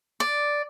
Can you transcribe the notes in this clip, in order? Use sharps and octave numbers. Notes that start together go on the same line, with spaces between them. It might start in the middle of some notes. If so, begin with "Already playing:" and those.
D5